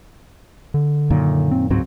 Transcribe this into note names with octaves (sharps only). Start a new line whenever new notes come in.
D3
F#2 A#2 D#3
C4
C#2 G#2 F#3 C4